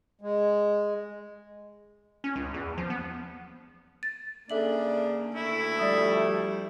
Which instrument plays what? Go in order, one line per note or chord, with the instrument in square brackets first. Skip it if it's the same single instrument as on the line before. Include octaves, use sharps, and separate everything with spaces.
[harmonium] G#3
[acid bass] C#4
C#2
E2
F3
B3
[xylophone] A6
[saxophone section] C#3 D4 [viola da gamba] A#3 [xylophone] A4 E5 F#7
[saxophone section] D2 A3 [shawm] E4
[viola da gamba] F3 G3 [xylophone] D5 E5 D#6